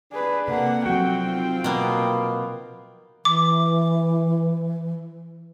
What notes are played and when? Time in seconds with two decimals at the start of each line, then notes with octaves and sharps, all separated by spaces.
0.12 D4 G#4 B4
0.48 C3 A#3 A4 F#5
0.86 F3 F#3 C4 F#4 G5
1.27 D#4 F4
1.64 B2 A#3 B3
3.25 E3 D6